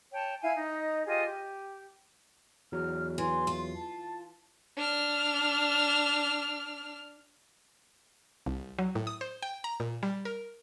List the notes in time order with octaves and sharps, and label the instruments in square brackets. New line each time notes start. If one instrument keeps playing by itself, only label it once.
[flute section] C#5 G5 A5
E4 E5 F5 G#5
D#4 D#5
F4 G4 G#4 D#5
G4
[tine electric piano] E2 F#3 [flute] F6
[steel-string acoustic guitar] E3 [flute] C6
[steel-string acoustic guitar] F4
[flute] A5
[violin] D4 F6
[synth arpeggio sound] C2
F#3
A2
D#6
C5
G5
A#5
A#2
G3
A#4